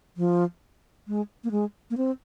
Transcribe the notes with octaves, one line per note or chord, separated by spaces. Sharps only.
F3
G#3
A#3
G#3
A#3
C4